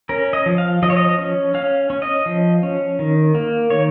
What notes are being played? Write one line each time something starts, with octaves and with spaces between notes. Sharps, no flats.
C#4 A#4
D#5
F3
F5
F3 D#5
C#5
D#5
C#4
C#4 F5
C#4
D#5
F3
C#4
D#3
A#3
D#3 C#5